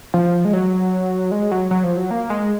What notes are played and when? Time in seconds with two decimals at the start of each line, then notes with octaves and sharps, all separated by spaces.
0.14 F3
0.45 G#3
0.53 F#3
1.31 G#3
1.51 F#3
1.71 F#3
1.84 F3
1.97 F#3
2.11 A#3
2.30 G#3